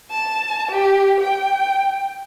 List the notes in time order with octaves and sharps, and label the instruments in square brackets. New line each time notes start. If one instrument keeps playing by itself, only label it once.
[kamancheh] A5
G4
G5